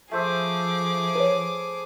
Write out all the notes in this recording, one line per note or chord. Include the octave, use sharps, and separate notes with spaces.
F3 A3 G#4 C5 E5 D6
B4 C#5